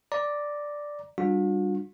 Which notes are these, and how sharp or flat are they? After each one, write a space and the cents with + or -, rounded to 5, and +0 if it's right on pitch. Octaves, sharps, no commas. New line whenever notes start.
D5 +0 A#5 +5
G3 +0 D4 +10 F#4 -45